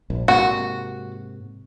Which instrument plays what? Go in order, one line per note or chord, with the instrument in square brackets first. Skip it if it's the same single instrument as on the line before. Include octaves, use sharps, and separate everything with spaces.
[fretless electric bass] A#1
[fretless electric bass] G#2 C3 A#3 [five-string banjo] F#4